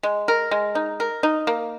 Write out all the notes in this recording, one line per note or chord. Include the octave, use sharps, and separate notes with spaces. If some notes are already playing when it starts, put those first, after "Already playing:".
G#3
A#4
G#3
D#4
A#4
D#4
A#3